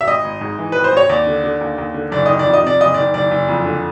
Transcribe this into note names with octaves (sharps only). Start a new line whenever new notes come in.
E5
G#1 D#5
G#1
G#2
E3
G#1 B4
C5
G#1 C#5
D#2 D5
D3
D3
D#2
D#2
D3
F#1 D5
D#3 D#5
D5
F2
D#5
C3 D5
F#1 D#5
D#3 D5
F#1 D5
F#1
F2
D3